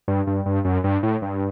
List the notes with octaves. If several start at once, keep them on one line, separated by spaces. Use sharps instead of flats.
G2
G2
G2
F#2
G2
A2
G2